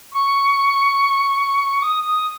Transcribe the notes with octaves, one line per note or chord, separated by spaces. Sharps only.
C#6
D#6
D#6